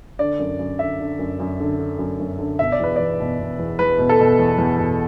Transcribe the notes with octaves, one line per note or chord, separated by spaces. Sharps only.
D3 D5
F#2
F#2
D3 E5
D3
F#2
F#2
D3
D3
F#2
F#2
D3
B2 E5
D5
E2 B4
E2 D5
B2
B2
E2
E2 B4
B2
A4
B2
E2
E2
B2